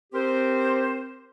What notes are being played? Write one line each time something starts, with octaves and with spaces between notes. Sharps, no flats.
C4 G4 A#4 C5